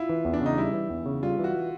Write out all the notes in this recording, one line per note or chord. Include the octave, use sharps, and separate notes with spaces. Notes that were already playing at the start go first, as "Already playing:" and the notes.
Already playing: E4 F4
E3
E2
D4
C#3 D#4
G3 E4
E3
E2
C#3
G3 F4
E3 F#4